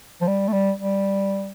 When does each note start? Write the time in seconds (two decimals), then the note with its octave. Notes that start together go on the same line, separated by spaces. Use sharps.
0.21 F3
0.27 G3
0.48 A3
0.53 G3
0.80 G3